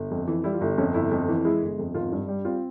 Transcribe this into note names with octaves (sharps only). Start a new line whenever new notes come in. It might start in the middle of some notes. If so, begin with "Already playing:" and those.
Already playing: G1
F2
E3
G3 E4
F4
G1 E4
F2 C#4
G1 E4
F2
E3
G#3 E4
G1
F2
G#1 F4
G2
G3
C4 F4